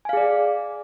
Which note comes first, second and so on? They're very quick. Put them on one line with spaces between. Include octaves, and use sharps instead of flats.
G#5 F5 G#4 D5